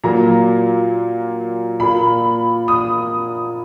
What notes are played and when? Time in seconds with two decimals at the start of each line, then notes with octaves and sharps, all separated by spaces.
0.04 A#2 F#3 A#3 A#5
1.80 A#2 A#3 B5
2.68 D#6